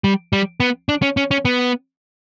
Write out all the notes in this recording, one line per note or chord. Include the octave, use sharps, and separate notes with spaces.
G3
G3
B3
D4
C#4
C#4
C#4
B3